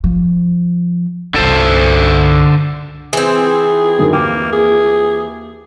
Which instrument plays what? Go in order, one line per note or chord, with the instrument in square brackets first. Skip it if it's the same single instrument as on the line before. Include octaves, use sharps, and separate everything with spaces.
[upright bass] F3
[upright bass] C2 G2 [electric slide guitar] D3 A4 C5
[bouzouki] E3 C4 [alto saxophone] G#4
[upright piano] F#2 D3 D#3
[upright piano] D#2 G5 D6 [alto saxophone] A#3
[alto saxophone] G#4